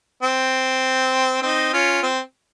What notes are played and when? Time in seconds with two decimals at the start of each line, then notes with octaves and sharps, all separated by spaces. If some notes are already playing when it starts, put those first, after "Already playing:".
0.23 C4
1.43 C4 D#4
1.73 C#4 F4
2.03 C4